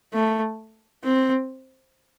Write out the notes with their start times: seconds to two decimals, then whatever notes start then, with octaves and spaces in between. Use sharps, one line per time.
0.14 A3
1.04 C4